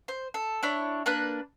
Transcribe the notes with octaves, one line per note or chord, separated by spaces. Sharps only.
C5
A4
D4 E4 C#5
A#3 D4 B4 F#6